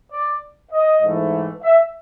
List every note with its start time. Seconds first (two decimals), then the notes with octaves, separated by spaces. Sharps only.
0.09 D5
0.71 D#5
1.01 G#2 E3 A3
1.63 E5